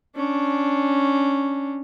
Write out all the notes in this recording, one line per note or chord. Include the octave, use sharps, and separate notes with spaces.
C#4 D4